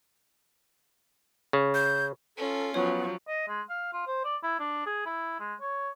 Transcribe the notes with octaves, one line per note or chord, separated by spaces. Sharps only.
C#3
G6
C#4 F4 A4
F3 F#3 B3 C#5
D#5
G#3
F5
F4
C5
D5
E4
D4
G#4
E4
G#3
C#5